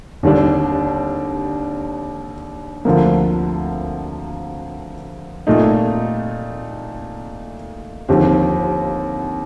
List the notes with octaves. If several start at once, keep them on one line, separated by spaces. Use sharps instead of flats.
D#2 D3 G3 D4
D2 D3 F3 A#3
A#2 A3 D#4
D#2 D3 F3 C4 G4